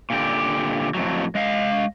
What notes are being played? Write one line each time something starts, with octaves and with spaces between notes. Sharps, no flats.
A#2 D3 G4
F2 A2 F#3
G#3 D#5 F5